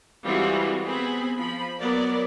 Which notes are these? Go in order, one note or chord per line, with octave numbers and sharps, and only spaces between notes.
E3 G3 G#3 C4 F4 F#4
B3 C4 G#4 B5
F3 B5
F#3 B3 A#4 D5